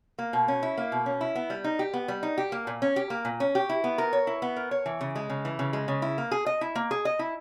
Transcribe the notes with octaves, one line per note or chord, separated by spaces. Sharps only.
A#3
B2
C#4
E4
A#3
B2
C#4
E4
B3
G3
D#4
G4
B3
G3
D#4
G4
A#3
A#2
C#4
G4
A#3
A#2
C#4
G4
E4
B3
A#4
C#5
E4
B3
A#4
C#5
E3
C#3
G#3
C#3
E3
C#3
G#3
C#3
E4
A#3
G#4
D#5
E4
A#3
G#4
D#5
E4